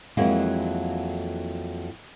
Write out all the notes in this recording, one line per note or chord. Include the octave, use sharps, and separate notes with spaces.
F2 E3 F#3 G#3 A#3